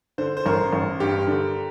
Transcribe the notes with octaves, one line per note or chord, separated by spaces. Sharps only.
D3 C5
C5
A1 A#4
A1
G2 G4
D3